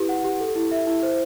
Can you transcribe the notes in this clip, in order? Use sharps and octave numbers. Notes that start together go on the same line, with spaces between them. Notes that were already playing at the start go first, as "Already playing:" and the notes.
Already playing: E4 G4 B4
F#5
G4
A4
E4
E5
E4
C5